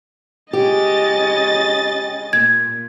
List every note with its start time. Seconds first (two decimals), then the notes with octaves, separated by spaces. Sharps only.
0.53 C#3 G#3 G4 D#5 A6
2.33 A#2 G#6